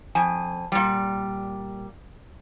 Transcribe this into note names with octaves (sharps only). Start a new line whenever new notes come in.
F2 G#5
A#2 G3